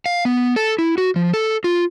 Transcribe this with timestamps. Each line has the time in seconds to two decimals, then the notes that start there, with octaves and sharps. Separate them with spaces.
0.06 F5
0.25 B3
0.56 A4
0.79 E4
0.98 F#4
1.16 F3
1.34 A4
1.64 F4